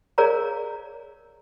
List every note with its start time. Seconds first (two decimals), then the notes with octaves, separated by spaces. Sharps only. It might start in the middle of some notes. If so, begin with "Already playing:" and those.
0.18 G#4 A#4 C#5 D5 F5 A#5